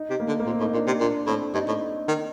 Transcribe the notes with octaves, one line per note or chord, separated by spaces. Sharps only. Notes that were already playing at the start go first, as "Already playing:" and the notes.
Already playing: D#4
C3
A#3
D3
A#3
A#2 C4
A2 D#4
A#2 D4
C3
A#2 D4
A2 C4
G2 D#4
A2
D#3